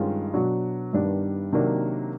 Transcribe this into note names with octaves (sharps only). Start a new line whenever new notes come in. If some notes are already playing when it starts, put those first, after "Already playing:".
Already playing: G2 D#3 G#3 C#4 F4
B2 F#3 B3 D4 F#4
G2 D#3 G3 B3 D4
C3 D#3 F#3 A#3 D4